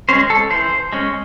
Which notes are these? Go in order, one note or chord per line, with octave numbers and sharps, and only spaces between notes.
G#3 C#4 C5
A4
E3 C5
G#3 C#4